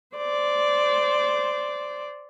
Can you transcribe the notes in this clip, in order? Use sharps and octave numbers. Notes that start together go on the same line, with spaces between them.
C5 D5